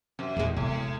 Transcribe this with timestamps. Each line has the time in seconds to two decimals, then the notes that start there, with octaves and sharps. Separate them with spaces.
0.19 F#2 C3
0.37 E2 A#2 G#3
0.57 A2 C3 B3